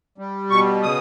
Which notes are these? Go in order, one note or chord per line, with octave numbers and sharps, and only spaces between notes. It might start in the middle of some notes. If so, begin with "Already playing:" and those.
G3
B2 C#6
C#3 D#6